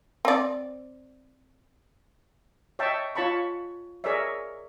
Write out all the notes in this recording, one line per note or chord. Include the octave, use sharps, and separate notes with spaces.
C4 D5
C#5 D#5 E5 G5 A5
F4 C#5 A5 B5 C#6
G#4 A#4 C#5 D5 E5